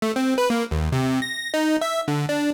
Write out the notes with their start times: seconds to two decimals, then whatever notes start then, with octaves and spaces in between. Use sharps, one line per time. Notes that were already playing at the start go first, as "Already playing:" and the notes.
0.02 A3
0.16 C4
0.38 B4
0.50 A#3
0.71 D#2
0.92 C3
1.22 A#6
1.54 D#4
1.81 E5
2.08 D3
2.29 D4